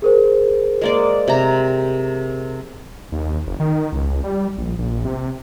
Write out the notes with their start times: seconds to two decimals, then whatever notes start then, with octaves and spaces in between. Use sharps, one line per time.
0.02 G#4 A#4 C5
0.81 G#3 A#3 D5
1.28 C3 A#5
3.12 D#2
3.47 F#1
3.60 D#3
3.92 C#2
4.24 G3
4.58 A#1
4.78 A#1
5.05 C3